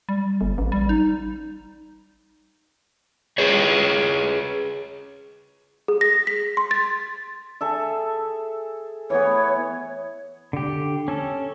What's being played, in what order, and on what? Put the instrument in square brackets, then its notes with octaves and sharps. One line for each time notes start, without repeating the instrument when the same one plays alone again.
[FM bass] G3
G1
A1
G3
D#4
[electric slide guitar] G#4 B4 C#5
[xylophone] G#4
A#6
B6
C6
A6
[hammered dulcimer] G#4 A4 E5
[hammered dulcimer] E3 B3 [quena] C#5
[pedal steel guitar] D3 G4
C#4 A4